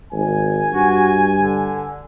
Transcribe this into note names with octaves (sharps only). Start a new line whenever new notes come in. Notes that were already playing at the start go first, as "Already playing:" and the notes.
G#1 G#5
G2 F#4
D3